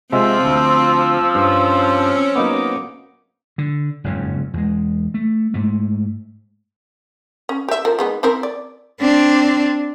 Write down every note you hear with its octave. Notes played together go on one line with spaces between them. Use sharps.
C3 F3 G#3 C4 F4 E6
D2
G2 C4 C#4
F#3 A#3 B3 D#4 D6
D3
F#1 F2 G#2 C#3
E2 G#3
A3
G#2 A3
C#4
G4 E5
F3 A#4
G#3 B3 D#4
C4 E4 A#4
D5
C4 D4